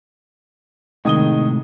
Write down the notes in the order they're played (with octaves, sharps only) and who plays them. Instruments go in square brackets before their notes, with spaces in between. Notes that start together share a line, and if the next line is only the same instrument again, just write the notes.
[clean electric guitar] A2 C3 G#3 [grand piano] D#3 D#6 G7